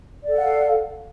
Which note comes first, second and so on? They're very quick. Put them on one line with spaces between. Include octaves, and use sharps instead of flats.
D5 A4 F#5 F5